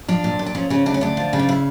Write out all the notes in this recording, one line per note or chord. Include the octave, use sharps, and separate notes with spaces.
F3 D4
A#2
A#2
D4
F3 C#4
C#3 C#4
D2 D4
C#4
D2 D4
F3
C#3
D4
E4